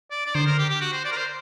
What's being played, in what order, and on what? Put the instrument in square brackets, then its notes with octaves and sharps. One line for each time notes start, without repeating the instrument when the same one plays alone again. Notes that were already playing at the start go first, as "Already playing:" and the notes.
[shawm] D5
D5
[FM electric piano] D3 [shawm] C5
[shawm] A#4
G4
G4
F#4
C5
D5
A#4
C5